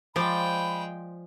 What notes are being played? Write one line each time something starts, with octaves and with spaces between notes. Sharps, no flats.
F3 G#3 C5 D5 G5 B5